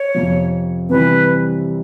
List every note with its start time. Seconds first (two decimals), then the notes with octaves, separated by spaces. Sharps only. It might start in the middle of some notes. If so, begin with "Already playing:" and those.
Already playing: C#5
0.14 F2 C3 F3
0.89 C3 E3 G3 B4